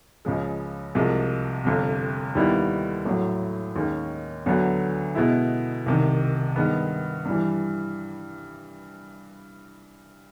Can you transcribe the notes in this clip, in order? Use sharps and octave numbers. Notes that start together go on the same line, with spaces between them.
C#2 C#3 F3 G#3
C2 C3 F3 G#3
G1 F2 C3
D#2 D#3 G3 B3 E4
A#1 A2 F#3
D#2 D#3 G#3 C#4
D2 D3 F#3 B3
B2 G#3 B3 E4
C2 C3 D#3
G2 D#3 G#3 B3
G2 E3 G3